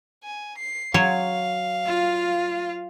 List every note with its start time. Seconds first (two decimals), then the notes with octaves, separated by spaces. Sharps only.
0.24 G#5
0.58 C7
0.94 F#3 C#5 F5 C6
1.86 F4